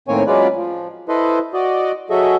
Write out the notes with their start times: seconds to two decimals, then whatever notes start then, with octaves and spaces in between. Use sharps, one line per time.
0.08 A2 D#3 A#3 C4 C#5 G#5
0.27 F#3 G#3 C#4 F4 B4 D5
0.55 F3
1.08 E4 A4 B4 C5 D#5
1.54 F#4 D5 D#5
2.10 F#3 F#4 G#4 A4 D#5 E5